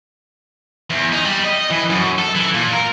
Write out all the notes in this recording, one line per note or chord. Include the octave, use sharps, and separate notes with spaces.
E2
D#4
G3
D#5
E3
F#2
A4
E3
A#2
A#4